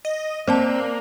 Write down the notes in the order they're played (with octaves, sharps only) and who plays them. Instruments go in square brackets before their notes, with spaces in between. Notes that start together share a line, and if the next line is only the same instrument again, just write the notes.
[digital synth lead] D#5
[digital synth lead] A#3 [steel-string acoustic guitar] C4 [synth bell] C5 D5 A5